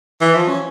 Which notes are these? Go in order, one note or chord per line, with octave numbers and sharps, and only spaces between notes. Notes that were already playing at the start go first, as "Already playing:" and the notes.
E3
F3
C#4